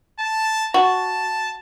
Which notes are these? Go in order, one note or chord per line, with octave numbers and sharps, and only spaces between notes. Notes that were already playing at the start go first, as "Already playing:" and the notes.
A5
F#4 A5